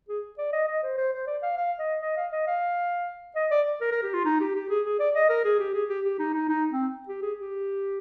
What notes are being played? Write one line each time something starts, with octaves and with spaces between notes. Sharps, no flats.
G#4
D5
D#5
D#5
C5
C5
C5
D5
F5
F5
D#5
D#5
F5
D#5
F5
D#5
D5
A#4
A#4
G4
F4
D#4
G4
G4
G#4
G#4
D5
D#5
A#4
G#4
G4
G#4
G4
G4
D#4
D#4
D#4
C4
G4
G#4
G4